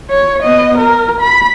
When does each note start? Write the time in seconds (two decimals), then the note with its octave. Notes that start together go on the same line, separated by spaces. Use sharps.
0.10 C#5
0.42 B3 D#5
0.78 A#4
1.21 B5